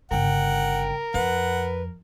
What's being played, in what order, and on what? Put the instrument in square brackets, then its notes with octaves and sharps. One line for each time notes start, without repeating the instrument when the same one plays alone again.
[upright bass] G1 C#3 [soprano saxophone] A#4 [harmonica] F#5 [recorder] G5
[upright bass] F2 [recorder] B4 [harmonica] F#5